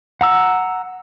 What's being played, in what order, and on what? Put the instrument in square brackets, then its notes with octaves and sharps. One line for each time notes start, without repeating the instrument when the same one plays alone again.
[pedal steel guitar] F#5 A#5 E6